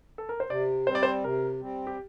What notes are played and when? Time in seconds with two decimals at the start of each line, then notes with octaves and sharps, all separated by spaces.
0.18 A4
0.29 A#4
0.40 C5
0.50 C3 D5
0.87 G3 C4 C5
0.95 D5
1.03 C5
1.24 C3 A#4
1.61 G3 C4
1.87 G4